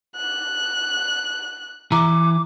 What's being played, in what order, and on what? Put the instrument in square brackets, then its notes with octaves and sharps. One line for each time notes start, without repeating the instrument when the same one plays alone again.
[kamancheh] F#6
[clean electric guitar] E3 [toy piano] A#5 [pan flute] D6